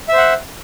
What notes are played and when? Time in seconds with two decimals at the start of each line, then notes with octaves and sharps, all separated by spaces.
0.09 E5
0.13 C5
0.17 F#5